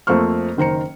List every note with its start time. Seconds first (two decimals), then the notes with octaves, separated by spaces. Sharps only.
0.07 F2 A3 A#3 C5 C#6 F6
0.57 F#1 D#3 C5 A#5 C#7